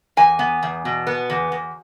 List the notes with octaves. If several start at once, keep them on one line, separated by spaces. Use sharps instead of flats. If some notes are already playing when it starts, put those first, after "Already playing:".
E2 G#5
B3
E2
B2
B3
E2
E2